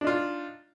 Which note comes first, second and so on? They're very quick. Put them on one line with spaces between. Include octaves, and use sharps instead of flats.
D4 D#4 F4